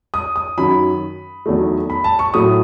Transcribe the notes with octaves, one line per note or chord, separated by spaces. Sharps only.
D#6
D#6
F#2 D#3 F#3 B5
E2 D#3 F#3 A3
B5
A5
C#6
A2 F#3 A3 D#6